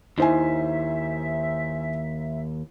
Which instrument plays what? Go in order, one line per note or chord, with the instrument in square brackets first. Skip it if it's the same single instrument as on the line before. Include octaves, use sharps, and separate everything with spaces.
[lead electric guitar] D#2 [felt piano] D#4 C5 G#5 [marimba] E4 [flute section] E5